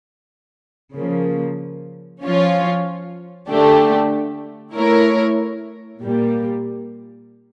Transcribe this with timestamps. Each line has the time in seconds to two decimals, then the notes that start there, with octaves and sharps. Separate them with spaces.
0.96 C#3 F3 A#3
2.23 F3 C#4 F4 C#5
3.48 D3 A3 D4 G4
4.75 A3 E4 A#4 C#5
6.02 A#2 G3 A#3